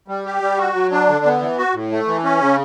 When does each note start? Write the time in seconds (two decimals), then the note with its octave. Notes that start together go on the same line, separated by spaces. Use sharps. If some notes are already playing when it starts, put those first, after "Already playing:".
0.08 G3
0.26 G4
0.42 G3
0.58 F#4
0.75 F#3
0.92 D4
1.09 D3
1.25 B3
1.41 E3
1.58 F#4
1.74 A2
1.91 A3
2.07 E3
2.24 C#4
2.41 C#3